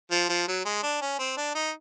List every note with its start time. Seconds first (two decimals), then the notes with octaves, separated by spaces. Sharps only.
0.11 F3
0.29 F3
0.48 F#3
0.65 G#3
0.83 D4
1.01 C#4
1.19 C4
1.37 D4
1.55 D#4